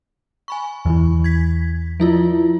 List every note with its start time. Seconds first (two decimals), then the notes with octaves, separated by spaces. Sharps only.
0.48 G#5 B5 C#6
0.86 E2 E3
1.24 G#6 B6
2.00 F3 E4 F4